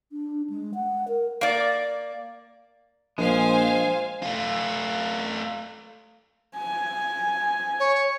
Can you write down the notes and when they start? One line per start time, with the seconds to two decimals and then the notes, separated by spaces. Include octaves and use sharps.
0.12 D4
0.50 G#3
0.74 F#5
1.08 A#4
1.41 A#3 D5
3.18 A#1 F3 G#3 C5 F5 G#5
4.22 A3 F4
6.57 G#5
7.80 C#5